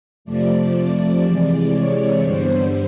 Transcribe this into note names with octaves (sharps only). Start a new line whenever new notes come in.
F2 C3 F3 A3 D5
C3 E3 G#3 D5
C#5
G2 D3 G3 B3 C5